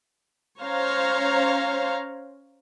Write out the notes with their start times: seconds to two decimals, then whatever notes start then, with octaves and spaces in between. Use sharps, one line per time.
0.61 C#4 C5 C#5 F5 A#5